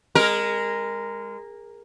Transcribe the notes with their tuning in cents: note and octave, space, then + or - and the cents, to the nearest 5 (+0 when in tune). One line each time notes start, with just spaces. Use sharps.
G#3 -25 A#4 +0